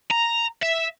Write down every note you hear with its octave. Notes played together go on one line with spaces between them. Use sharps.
A#5
E5